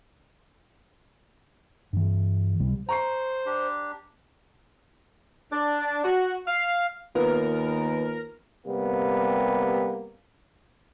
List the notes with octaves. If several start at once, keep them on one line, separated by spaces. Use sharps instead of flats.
G2 E3
C#2 C3 G3
C5 A#5 C#6 C7
D4 G4
D4
F#4
F5
D#2 B3 F4 A#4
C3 G3 A#3 B3